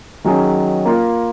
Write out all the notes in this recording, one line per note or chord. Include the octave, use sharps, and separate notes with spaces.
D#3 F#3 C#4 G#4 D#5
A#3 F4 A#4